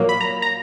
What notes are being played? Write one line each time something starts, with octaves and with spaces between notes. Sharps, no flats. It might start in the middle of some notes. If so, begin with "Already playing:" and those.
Already playing: A#2 F#3 A#3
B5
A#5
A#5